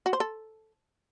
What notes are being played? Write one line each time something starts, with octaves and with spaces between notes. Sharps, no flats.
F#4
C5
A4